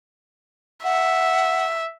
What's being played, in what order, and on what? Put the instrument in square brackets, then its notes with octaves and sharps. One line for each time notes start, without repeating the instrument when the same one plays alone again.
[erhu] E5 [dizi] F#5